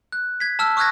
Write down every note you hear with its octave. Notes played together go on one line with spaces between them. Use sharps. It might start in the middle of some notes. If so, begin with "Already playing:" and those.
F#6
G#6 B6
A5 E6 F6
C#6 D#6 F6 F#6 G#6 A#6